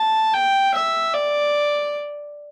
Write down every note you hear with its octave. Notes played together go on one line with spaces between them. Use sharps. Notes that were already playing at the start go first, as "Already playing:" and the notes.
Already playing: A5
G5
E5
D5